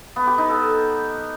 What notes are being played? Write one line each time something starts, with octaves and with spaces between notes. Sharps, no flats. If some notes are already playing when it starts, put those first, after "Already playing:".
B3
G4
D#4
A4